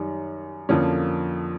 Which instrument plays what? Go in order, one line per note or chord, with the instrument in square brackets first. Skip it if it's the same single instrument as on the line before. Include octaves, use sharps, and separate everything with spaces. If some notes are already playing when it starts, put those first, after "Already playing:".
Already playing: [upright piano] F#2 D#3 G3
F2 D3 F3 A#3 C#4